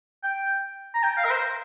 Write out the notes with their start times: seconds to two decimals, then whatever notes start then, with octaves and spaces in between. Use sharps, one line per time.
0.23 G5
0.94 A#5
1.03 G5
1.18 F5
1.25 A#4
1.31 C5